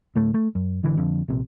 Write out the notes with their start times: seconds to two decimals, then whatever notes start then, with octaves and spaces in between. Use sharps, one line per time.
0.16 D2 A2 A3
0.34 A3
0.55 F#2
0.83 G#1 D3 E3
0.97 F2 D3
1.28 A#1 C3